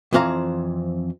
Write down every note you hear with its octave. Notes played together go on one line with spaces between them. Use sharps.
F2 E3 C4 F5 A#5